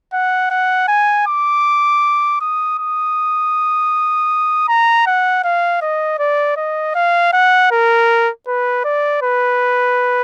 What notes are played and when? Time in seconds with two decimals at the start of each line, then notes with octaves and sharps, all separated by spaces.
0.13 F#5
0.50 F#5
0.88 G#5
1.27 D6
2.41 D#6
2.78 D#6
4.68 A#5
5.06 F#5
5.44 F5
5.82 D#5
6.19 D5
6.57 D#5
6.95 F5
7.33 F#5
7.71 A#4
8.48 B4
8.84 D5
9.22 B4